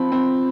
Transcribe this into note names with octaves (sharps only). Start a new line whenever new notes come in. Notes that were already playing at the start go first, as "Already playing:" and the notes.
Already playing: F3 C4 B5
C4